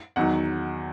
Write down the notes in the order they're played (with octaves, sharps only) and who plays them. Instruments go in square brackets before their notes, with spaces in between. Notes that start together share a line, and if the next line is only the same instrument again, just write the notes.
[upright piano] E2 D#3 F#3 F#5